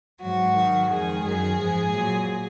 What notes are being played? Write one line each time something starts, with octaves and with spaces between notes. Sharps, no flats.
G#2 F#3 F#4
G#2 D#3 F#3
F2 D#3 G#3 G#4
F#2 D#3 F#3 G#4
G#2 F3 G#3
A#2 F#3